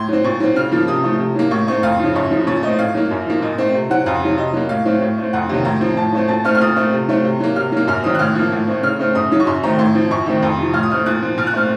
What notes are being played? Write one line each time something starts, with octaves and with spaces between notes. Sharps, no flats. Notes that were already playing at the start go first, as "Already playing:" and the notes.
Already playing: A2 C6
F#3 C4
A#2 C#6
F#3 C4
C#3 F6
F3 A#3
C3 D#6
F3 A3
C3
F#3 A#3
A2 C#6
A3 C4 C#6
F2 F5
C#3 F3
F#2 C#5
C#3 F3
A#2 C#5
A3 C4 D#5
A2 F5
F#3 A#3
F#2
F3 A#3
A#2 D#5
A3 C4
C3
F#3 C4 F#5
F2 F5
C3 F#3
C3 D#5
F#3 A#3
A2 F5
F#3 A3 C4
A2
A3 C4
F2 F#5
C3 D#3 F#3 A#3
A2 A#5
F3 C4
A2 A5
F#3 A3 C4
A#2 A5
A3 C4 F6
F6
A#2 D#6
A3 C4
C3
F#3 A3 C4
C3
F#3 A#3
C3 F6
F#3 A#3
F#2 F6
D#3 F#3 C4 D#6
F#6
A2 F6
F3 A#3
A2
A3 C4
C#3 F6
A3 C4
F#2 D#6
C#3 F#3
C#6
F#2 C6
D#3 A3 C4 A#5
A2 C6
F3 C4
F#2 C#6
D#3 A3 C4
F2
C3 F3
A2 F6
D#6
A3 C4 F6
A#2 F#6
F3 C4
A#2 F6
F#6
A3 C4 F6